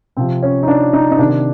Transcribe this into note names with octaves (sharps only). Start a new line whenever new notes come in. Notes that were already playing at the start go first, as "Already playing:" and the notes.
C3 F3 C4
C#4
D#4
D4
D#4
D#4
C3 D#3 D4